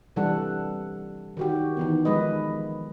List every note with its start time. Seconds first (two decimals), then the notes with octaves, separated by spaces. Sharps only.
0.16 C3 E3 G3 D4 A4 F#5
1.37 D#3 F#4 G4
1.77 D#3 E3 B3
2.05 F3 G#3 B4 D#5